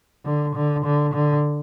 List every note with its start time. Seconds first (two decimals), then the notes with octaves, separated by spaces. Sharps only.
0.25 D3
0.56 D3
0.85 D3
1.14 D3